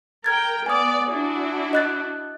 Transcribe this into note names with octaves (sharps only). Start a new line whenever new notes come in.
A#4 G5 F6 G#6 A6
B3 D5 G#5 D#6
D4 E4 F#4
D#5 F#6 A6